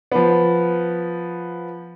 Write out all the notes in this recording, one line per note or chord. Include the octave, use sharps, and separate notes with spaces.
F3 B3